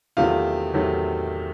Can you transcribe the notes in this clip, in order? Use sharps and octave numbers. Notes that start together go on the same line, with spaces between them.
E2 C3 D#3 F#3 A3 F4
E2 C3 D#3 F#3 A3